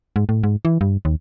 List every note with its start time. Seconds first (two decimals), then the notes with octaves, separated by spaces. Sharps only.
0.16 G#2
0.29 A2
0.43 G#2
0.65 E3
0.81 G2
1.05 D#2